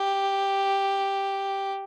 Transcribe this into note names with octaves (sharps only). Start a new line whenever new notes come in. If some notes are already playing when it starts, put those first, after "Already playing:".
Already playing: G4